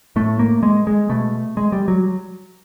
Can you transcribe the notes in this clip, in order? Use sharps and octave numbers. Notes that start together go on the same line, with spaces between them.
A2 A3
A#3
G#3
G#3
B2 A3
G#3
G3
F#3